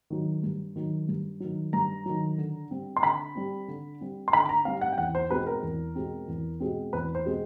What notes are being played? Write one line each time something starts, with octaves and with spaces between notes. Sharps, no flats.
D#3 F#3
G2
D#3 F#3
G2
D#3 F#3
G2 A#5
D#3 F#3
D3
G3 C4
C6
D3 B5
G3 C4
D3
G3 C4
C6
D3 B5
A#5
G3 C4 F5
F#5
G5
E2 F#5
C5
B2 G#3 C4 B4
A#4
E2
B2 G#3 C4
E2
B2 G#3 C4
E2 B4
C5
B2 G#3 C4